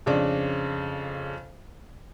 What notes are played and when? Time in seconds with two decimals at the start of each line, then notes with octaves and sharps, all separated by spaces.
0.06 F2 C#3 D4